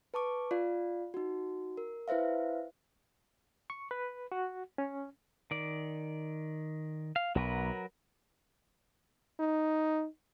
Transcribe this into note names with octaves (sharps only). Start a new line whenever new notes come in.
B4 A5 C#6 D6
F4 D5 F5
D#4 F#4
A#4
E4 B4 C5 E5 F5
C#6
B4
F#4
C#4
D#3 D5
F5
B1 F#3 A#4 B4
D#4